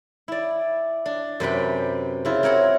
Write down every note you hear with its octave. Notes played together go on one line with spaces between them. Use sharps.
E4 D5
D4
F#2 C3 B4 G5
C#3 E4 F4
C4 A#4 C#5 F#5